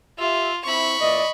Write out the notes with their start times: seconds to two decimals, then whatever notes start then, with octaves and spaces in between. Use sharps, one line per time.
0.18 F4 G4 E5
0.65 C4 E4 B5 C#6
1.00 A#2 E3 D5 D#5